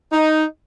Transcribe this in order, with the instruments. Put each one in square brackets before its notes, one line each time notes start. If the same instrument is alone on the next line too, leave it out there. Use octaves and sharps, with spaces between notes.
[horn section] D#4